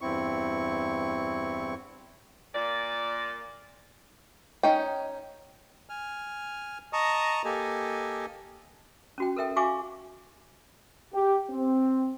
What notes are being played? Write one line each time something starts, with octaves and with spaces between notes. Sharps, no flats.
E2 G2 C4 E4 C#6
A#2 D5
C#4 D#4 G5
G#5 F6
D#5 A5 A#5 C#6 D#6
A#3 G4 A4 D#5 G#5
C#4 F#4 G5
A4 A#4 E5 G5
F#4 E5 F5 G#5 C#6 D6
G4
C4